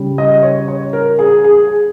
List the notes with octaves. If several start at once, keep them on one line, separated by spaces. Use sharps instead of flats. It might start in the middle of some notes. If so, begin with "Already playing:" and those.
Already playing: C#3 G3
D#5
C#5
C#5
A#4
G#4
G#4